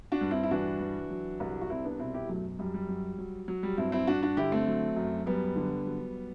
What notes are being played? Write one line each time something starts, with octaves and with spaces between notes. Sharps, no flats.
D4 F#4
G2
C4 E4
E4
E3 D4 F#4
E3
F#3
C2
F#4
C2 C4 E4
B3 D4
B2 C4 E4
E4 G4
F#2 F#3 A3
F#2 G3
G3
F#3
F#3
F#3
G3
G2 C4 E4
C4 E4
G2 D4 F#4
D4 F#4
D3 E4 G4
A3 C4
F#3
F#2
F#2 G3 B3
D3
F#3